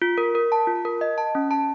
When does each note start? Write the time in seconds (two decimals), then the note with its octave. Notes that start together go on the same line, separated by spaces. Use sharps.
0.02 F4
0.18 A#4
0.35 A#4
0.52 A5
0.67 F4
0.85 A#4
1.01 D#5
1.18 A5
1.35 C#4
1.51 A5